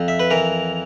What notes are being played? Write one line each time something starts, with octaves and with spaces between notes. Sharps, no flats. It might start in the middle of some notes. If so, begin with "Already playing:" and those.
Already playing: F2
E5
B4
E3 A#4